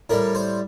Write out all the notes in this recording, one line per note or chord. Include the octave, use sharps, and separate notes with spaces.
A2 G3 A#4
C5